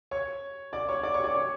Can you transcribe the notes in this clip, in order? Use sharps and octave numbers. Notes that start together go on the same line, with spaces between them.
C#5 C#6
D5 D6
C#5 C#6
D5 D6
C#5 C#6
D5 D6
C#5 C#6